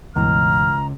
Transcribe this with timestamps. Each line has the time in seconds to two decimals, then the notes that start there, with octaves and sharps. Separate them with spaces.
0.16 C#2 G2 B2 E3 A#5 F6